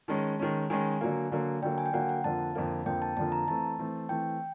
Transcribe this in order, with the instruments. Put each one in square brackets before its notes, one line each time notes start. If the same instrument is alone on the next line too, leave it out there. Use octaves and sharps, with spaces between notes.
[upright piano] D#3 G#3 C#4 [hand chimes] A5
[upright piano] D#3 G#3 C#4
[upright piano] D#3 G#3 C#4 [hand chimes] G#5
[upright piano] D3 F#3 A#3
D3 F#3 A#3
[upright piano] D3 F#3 A#3 [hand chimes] G5
[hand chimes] G#5
G5
[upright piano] D3 F#3 A#3 [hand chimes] F#5
[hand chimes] F#5
[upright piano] F2 D3 F3 A#3 [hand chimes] A5
[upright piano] F2 D3 F3 A#3
[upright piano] F2 D3 F3 A#3 [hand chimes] G5
[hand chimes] A5
[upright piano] F2 D3 F3 A#3 [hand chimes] A5
[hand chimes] A#5
[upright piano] E3 A3 C4 [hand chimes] A5
[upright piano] E3 A3 C4
[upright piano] E3 A3 C4 [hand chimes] G5